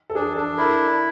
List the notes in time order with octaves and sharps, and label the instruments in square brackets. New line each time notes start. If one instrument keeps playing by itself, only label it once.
[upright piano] A4
[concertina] D4 [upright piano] G#4
[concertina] D4 [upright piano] A4
[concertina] E4 [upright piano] A#4